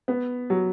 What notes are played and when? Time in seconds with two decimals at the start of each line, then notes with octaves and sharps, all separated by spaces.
0.08 B3
0.50 F#3